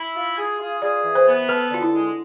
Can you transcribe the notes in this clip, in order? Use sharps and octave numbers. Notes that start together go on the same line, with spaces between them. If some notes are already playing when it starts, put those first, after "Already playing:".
Already playing: E4
F4
G#4
F4
G#4 D5
E3
C5
B3
A4 B4
D3 F4
E4
G#3